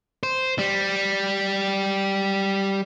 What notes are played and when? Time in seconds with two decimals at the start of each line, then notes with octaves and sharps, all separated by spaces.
0.23 C5
0.59 G3